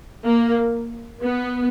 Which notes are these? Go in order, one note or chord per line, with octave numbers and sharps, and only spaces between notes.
A#3
B3